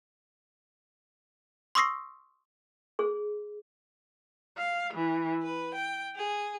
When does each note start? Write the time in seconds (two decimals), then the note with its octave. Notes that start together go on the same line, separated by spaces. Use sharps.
1.75 C6 C#6 D#6 E6 A#6 C7
2.99 G#4
4.56 F5
4.92 E3
5.41 B4
5.75 G5
6.14 G#4